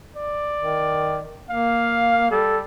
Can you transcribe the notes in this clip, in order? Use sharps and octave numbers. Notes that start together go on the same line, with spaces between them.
D5
D#3
A#3 F5
G3 A4